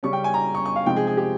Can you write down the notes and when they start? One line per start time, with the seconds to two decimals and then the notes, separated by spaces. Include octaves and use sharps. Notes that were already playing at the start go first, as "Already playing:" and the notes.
0.03 C#3 G3 C#4 C#6
0.13 G5
0.24 G#5
0.34 A#5
0.55 C#6
0.66 C#6
0.76 F5
0.86 C3 F3 G#3 C4 D#4 G5
0.96 G#4
1.07 G#4
1.17 G4